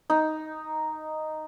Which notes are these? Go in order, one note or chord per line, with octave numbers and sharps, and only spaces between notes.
D#4